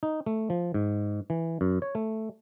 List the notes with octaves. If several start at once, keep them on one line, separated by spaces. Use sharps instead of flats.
D#4
A3
F3
G#2
E3
F#2
C#5
A3